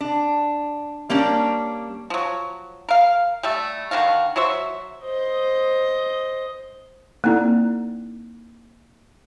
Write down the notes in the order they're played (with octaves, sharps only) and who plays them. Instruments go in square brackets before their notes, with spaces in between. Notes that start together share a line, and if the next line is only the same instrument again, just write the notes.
[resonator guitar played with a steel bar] D4
G3 A#3 C#4 D4
[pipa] F3 F#3
A#4 F5
G3 A3 E5
D3 D#3 F#4 F5
F#3 F#4 C5 E5
[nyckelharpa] C5 D#5
[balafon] A#3 C4 D#4 E4 A4 D5